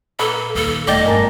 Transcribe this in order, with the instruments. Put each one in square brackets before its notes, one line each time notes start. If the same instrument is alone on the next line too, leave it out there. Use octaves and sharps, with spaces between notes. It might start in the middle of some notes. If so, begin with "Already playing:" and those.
[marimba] A#2 [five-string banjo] A#3 B4 B5 [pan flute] A4
[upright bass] D#2 [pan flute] A4
[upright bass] E1 [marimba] A3 [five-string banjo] D5 G5 [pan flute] D#5
[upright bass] G1 [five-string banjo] D4 [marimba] A#4 G#5 A#5